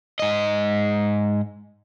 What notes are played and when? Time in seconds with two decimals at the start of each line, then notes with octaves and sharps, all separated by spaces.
0.20 G#2 D#5